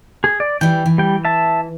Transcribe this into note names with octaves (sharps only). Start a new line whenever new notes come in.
G#4
D5
E3 G3 G5
E3
G3 G5
E5 A5